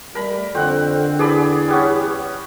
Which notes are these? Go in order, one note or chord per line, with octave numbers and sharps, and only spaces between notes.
G3 A3 A#4 D5 B5
F2 D3 C4 F#5
E2 G#4 D5 B5
G3 B3 C#4